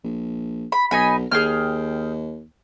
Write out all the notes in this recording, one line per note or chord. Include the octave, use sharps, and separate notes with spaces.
A#1
B5
B1 D#4 G#5 B5
D#2 G#4 G5 F6